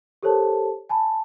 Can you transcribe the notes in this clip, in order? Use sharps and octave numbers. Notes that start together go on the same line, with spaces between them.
G4 A4 A#4 C5 C#5 A5
G#5 A5 B5